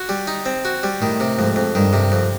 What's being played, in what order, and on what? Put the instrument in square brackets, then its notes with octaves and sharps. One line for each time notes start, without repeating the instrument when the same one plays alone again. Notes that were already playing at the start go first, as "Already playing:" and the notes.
Already playing: [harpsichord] F#4
G3
D#4
C4
F#4
G3
[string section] A2 [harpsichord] D#3
[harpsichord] C3
[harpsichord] F2 [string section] G#2
[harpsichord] F2
[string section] G2 [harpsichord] D#3
[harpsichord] C3
F2